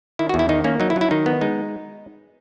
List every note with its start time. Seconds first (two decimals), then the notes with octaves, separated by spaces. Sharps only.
0.19 D#3 E4
0.29 F#4
0.34 E2
0.39 E4
0.49 D#3 D#4
0.64 A#3 C#4
0.80 F#3 D#4
0.90 E4
0.96 F#3
1.01 E4
1.11 D#3 D#4
1.26 B3
1.41 G#3 D#4